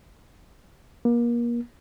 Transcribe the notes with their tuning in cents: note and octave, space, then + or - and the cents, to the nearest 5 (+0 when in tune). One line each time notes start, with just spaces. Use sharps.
A#3 +30